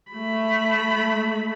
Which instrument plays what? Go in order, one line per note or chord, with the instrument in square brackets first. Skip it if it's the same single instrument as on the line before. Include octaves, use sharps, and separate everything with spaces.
[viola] A3 B5